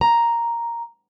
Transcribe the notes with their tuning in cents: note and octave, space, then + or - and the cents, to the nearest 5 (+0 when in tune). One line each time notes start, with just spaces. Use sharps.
A#5 +0